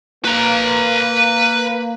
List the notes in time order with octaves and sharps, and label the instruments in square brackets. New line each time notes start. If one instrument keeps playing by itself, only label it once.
[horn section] A#3 [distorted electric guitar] B4 A#5